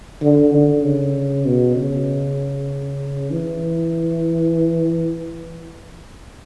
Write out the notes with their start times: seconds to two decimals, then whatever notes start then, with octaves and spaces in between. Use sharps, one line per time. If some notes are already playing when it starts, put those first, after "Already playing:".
0.22 D3
0.54 D3
0.84 C#3
1.45 B2
1.76 C#3
3.31 E3